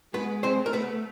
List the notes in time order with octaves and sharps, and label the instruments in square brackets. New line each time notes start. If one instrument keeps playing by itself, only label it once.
[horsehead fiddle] G#3 [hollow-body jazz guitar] B3 B4
[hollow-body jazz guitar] C4 C5
[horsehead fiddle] A3
[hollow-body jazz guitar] A#4
B3 B4